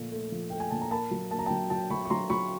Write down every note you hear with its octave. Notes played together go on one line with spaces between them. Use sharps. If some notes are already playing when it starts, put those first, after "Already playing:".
Already playing: A#2 F3 A3
A3
F3
A3 G5
G#5
A#2 A5
A#5
A#3 A5 B5
F#3
A#3 A5
A#5
F#3 G5 A5
F#3 G5 A5
F#3 B5 C#6
C#6
F#3 A#5 C6
F#3 B5 C#6